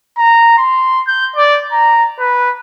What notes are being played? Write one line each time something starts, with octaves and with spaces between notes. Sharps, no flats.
A#5
C6
G6
D5
A#5
B4